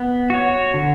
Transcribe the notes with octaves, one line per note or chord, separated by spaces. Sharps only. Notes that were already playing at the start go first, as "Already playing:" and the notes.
Already playing: B3
F#4 C#5
D3